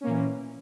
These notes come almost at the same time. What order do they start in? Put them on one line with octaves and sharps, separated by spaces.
C#4 A#3 A#2 E3